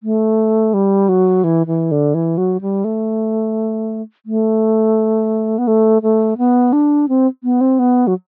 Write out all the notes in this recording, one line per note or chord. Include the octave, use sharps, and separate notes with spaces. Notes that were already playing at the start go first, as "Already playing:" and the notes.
A3
G3
F#3
E3
E3
D3
E3
F#3
G3
A3
A3
B3
A3
A3
B3
D4
C4
B3
C4
B3
F#3